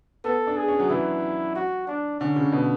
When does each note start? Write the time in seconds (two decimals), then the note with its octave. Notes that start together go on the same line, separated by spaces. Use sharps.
0.24 B3 A4
0.47 D4
0.57 G#4
0.68 C#4
0.79 F#3
0.89 E3 E4
1.55 F#4
1.87 D4
2.20 D3 C#4
2.36 C#3
2.52 B2